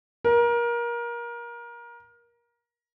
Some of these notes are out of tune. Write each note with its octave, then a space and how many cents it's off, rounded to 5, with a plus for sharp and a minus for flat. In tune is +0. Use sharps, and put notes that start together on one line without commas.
A#4 +25